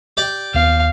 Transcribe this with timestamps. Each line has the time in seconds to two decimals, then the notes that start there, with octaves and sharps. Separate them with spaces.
0.17 G4 D5
0.54 D#2 B3 F5